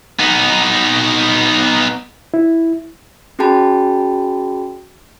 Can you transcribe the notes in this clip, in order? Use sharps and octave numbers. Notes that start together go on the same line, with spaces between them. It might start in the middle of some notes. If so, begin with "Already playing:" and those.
B3 D#4
E4
C#4 F#4 G#4 G5 A5 B5